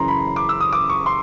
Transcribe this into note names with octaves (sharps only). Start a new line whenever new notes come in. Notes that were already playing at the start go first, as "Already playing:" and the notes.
Already playing: F#2 C#3 E3 A#5 C6
B5
D6
E6
D#6
D6
C#6
C6